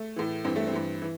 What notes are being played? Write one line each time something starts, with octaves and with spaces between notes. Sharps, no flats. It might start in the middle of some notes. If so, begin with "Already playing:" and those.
Already playing: A3
A2 E3
G2 E3 C4
A3
C4
G2 E3
E3